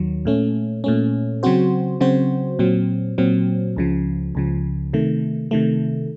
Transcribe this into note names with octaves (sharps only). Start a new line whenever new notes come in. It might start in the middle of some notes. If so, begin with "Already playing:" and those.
Already playing: D#2 D#3 F#3
A#2 A3 C#4
A#2 A3 C#4
C#3 F#3 C4 F#4 C5
C#3 F#3 C4 F#4 C5
A#2 F#3 C4
A#2 F#3 C4
C#2 C#3 F3
C#2 C#3 F3
C3 D#3 A3
C3 D#3 A3